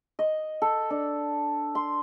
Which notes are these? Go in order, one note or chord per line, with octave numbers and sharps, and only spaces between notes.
D#5
A4
D4
C6